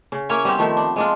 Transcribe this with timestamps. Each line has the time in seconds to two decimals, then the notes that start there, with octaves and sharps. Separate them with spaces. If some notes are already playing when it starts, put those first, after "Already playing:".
0.12 C#3
0.29 A#3 C#4 E4 C#5
0.45 G3 B3 C4 G4
0.59 D#3 F3 A3
0.77 D4
0.96 G#3 D4 F4